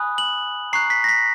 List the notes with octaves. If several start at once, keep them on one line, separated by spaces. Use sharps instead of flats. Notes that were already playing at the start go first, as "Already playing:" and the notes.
Already playing: G#5 B5 D#6 F#6
F#7
A#5 C#6 F#6 C7
B6
A#6
B6